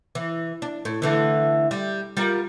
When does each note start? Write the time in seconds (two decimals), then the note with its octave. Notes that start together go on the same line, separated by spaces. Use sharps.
0.15 E3
0.62 D4
0.85 A2
1.02 D3 E3 A3
1.71 G3
2.17 G3 F4 A#4